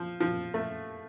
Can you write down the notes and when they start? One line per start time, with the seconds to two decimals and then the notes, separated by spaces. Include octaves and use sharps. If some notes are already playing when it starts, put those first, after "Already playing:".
Already playing: F3
0.20 F3
0.54 A3